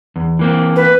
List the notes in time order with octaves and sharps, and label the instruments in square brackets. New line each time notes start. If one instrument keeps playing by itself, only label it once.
[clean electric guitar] E2
E3 A#3 C4
[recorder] B4